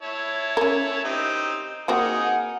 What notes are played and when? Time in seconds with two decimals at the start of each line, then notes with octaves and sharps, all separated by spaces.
0.03 E4 C#5 A5
0.57 C#4 A#4
1.04 C4 D#4 G4
1.88 A#3 C4 D#4 F#4 G#4 A#4 F#5